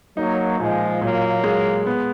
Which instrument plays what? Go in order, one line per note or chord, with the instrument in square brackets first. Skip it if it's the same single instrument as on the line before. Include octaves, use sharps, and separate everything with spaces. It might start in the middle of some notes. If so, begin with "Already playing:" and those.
[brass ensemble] F#3 A#3 [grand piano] D#4
[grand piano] A#2 [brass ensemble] F3 G#3
[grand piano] A#2 [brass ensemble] F#3 A#3
[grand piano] G#3
B3